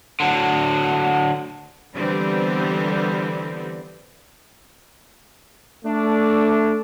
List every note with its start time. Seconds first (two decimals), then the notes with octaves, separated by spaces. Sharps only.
0.20 D3 F#3
1.95 D3 E3 G3 B3 C4
5.85 A3 D4